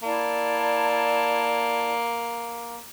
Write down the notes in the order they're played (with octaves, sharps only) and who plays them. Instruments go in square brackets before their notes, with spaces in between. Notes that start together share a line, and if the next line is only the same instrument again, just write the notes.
[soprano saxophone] A#3 [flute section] E4 D5 A5